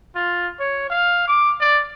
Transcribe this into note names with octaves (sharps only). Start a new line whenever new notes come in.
F4
C#5
F5
D6
D5